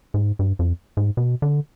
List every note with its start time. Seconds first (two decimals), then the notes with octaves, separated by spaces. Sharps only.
0.14 G#2
0.39 G2
0.59 F2
0.97 G#2
1.17 B2
1.42 D3